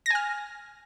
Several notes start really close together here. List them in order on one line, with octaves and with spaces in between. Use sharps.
A#6 G#5 F6